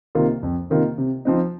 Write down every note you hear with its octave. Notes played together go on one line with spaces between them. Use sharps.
C3 D#3 A#3 F4
F2
C3 D#3 A#3 F4
C3
F3 C4 D#4